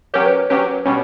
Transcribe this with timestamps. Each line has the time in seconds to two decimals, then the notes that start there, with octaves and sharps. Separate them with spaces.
0.14 F#3 C#4 G4 A#4 C#5
0.26 B4
0.38 B4
0.50 F#3 C#4 G4 B4
0.85 B2 G3 C#4